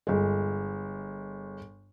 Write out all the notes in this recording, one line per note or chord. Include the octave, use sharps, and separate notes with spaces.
G1 G#3